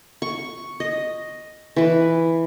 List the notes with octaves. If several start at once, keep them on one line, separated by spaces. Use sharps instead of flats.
C#6
D#5
E3 B4